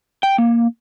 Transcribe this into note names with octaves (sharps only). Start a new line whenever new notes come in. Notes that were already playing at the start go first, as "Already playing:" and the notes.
G5
A#3